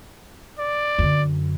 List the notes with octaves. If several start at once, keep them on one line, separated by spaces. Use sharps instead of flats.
D5
F#2 D3